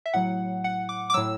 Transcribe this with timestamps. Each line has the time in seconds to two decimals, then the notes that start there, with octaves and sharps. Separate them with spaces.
0.06 E5
0.14 A2 F#3 F#5
0.64 F#5
0.89 D6
1.10 D6
1.14 A2 F#3 E6